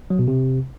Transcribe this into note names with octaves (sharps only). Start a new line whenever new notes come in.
F#3
B2
C3